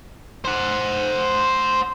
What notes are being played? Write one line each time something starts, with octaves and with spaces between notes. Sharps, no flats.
C5 F#5